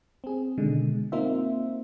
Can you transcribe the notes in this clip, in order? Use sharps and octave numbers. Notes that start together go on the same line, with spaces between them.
C4 G#4
B2 D3 D#3 G#3
A#3 C4 D#4 F4 C5 E5